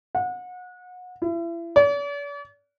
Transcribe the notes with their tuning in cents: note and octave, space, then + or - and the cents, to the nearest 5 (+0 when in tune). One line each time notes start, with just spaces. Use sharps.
F#5 -30
E4 +35
D5 -45